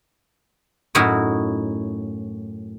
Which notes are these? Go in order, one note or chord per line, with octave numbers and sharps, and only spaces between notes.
F#2 A2 D#4 E4 F#4